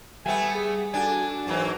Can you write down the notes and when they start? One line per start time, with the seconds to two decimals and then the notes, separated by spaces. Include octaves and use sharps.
0.26 G3 A3 B3 E5 G#5
0.55 G#4
0.94 D4 F#4 A4 G#5 A5
1.47 G#2 E3 F#3 A#3